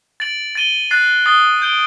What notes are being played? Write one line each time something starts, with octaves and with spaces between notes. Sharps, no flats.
A6 D7 F#7
A6 D#7 G7
F#6 A6 C7
D#6 A6 C7 G7
G6 D7 G7